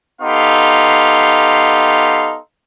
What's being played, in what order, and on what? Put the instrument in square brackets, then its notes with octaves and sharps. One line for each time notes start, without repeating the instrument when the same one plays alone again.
[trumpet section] B3 D#4 G4 A4 F5 C6